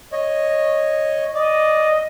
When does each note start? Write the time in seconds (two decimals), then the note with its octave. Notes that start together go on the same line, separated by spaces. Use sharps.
0.12 C#5 D#5
1.35 D5 D#5